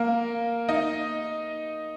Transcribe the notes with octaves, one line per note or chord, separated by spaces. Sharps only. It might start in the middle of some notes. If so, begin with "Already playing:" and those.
Already playing: A#3 A#4
D#4 D#5